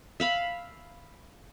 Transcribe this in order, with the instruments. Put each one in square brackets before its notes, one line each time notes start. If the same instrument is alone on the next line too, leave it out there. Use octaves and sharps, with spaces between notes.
[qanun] E5 F5 B5